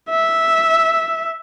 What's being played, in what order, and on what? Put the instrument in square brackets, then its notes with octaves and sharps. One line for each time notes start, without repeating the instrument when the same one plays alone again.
[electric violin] E5